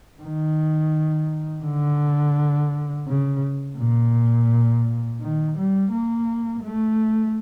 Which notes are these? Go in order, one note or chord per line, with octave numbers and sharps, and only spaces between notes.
D#3
D3
C#3
A#2
D#3
G3
A#3
A3